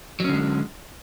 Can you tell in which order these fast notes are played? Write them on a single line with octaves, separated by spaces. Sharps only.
F#3 C#4 D3 G#3